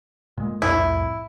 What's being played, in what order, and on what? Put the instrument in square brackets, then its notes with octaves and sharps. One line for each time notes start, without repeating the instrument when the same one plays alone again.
[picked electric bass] A#2 G#3
[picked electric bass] C2 F2 A2 [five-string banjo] E4